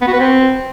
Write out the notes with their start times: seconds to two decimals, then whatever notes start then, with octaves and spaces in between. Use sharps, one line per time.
0.01 B3
0.07 F#4
0.13 B4
0.19 C4